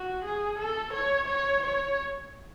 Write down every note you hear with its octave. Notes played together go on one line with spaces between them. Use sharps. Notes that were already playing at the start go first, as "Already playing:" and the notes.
Already playing: F#4
G#4
A4
C#5
C#5
C#5